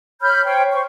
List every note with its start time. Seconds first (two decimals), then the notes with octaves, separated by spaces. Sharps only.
0.22 C#5 B5 F6 G6
0.44 C5 C#5 G5
0.73 C5 C#6